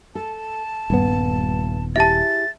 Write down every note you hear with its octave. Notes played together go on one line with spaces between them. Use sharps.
A4 A5
D#1 G2 B3
E4 G4 G#4 E5 A5 A6